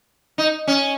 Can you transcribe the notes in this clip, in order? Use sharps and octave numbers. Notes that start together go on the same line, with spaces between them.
D#4
C#4